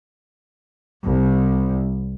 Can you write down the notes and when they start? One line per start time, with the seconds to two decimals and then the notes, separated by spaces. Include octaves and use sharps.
1.05 C2